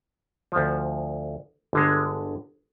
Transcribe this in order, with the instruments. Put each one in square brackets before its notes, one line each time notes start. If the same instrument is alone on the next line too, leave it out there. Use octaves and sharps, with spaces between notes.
[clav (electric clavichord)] D2 F3
G1 D3 G#3